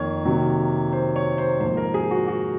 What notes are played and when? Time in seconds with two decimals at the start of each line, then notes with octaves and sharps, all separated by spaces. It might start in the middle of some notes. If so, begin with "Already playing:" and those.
Already playing: F2 D#3 A#3 C#5
0.25 C3 D#3 F#3 A#3
0.92 C5
1.16 C#5
1.38 C5
1.60 G#2 F3 A#3 C5
1.77 A#4
1.94 G#4
2.11 F#4
2.28 F#4